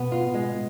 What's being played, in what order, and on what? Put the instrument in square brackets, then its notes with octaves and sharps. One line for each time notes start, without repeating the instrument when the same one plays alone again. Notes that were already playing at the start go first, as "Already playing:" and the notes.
Already playing: [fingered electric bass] B2 [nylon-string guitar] B3
[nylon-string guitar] F4
G#3